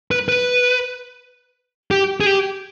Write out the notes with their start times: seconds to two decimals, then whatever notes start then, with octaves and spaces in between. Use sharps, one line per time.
0.11 B4
0.29 B4
1.91 G4
2.21 G#4
2.26 G4